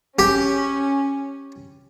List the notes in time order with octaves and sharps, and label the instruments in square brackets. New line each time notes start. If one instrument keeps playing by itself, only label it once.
[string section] C#4 [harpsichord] G4